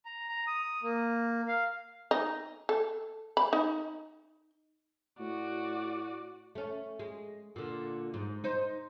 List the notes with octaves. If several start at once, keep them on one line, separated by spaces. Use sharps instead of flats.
A#5
A#5
D#6
A#3
F5
D#4
A4
B5
D#4
A2 F#4 D5
A3 C#4
G#3
A#2 D3
G#2
D#4 C5